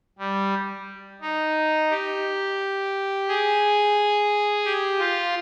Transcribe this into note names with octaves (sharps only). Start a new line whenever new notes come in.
G3
D#4
G4
G#4
G4
F4